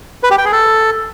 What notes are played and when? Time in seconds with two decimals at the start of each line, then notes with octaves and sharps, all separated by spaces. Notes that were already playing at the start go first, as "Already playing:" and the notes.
0.23 B4
0.31 G4
0.38 G5
0.45 G#4
0.52 A4